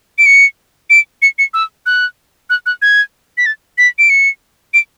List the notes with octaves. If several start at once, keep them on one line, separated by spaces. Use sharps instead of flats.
D7
C#7
D7
C#7
C#7
E6
F#6
F#6
F#6
G#6
B6
A6
B6
D7
C#7
D7